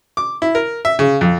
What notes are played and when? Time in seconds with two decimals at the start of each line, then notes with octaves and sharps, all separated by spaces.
0.17 D6
0.42 E4
0.55 A#4
0.85 E5
0.99 C#3
1.21 F2